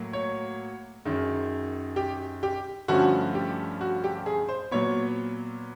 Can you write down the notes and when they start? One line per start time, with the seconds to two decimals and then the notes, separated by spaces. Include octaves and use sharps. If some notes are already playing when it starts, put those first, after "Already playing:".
Already playing: A2 F#3 A#3
0.13 C#5
1.05 F#2 D#3 G#3
1.96 G4
2.43 G4
2.88 G2 D3 F3 A3 C#4 F#4
3.35 G4
3.81 F#4
4.04 G4
4.26 G#4
4.49 C5
4.71 A#2 F#3 B3 C#5